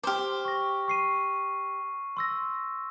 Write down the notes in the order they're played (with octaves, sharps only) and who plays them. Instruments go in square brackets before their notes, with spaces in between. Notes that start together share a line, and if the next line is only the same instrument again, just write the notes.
[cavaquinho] G4 C5 [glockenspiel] D6 F6
[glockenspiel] C#6 A#6
C#6 C7 D#7
C6 E6 A#6